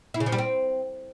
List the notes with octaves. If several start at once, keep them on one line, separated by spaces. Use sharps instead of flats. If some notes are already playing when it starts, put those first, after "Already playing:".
E4
C#3
F3
G3
C4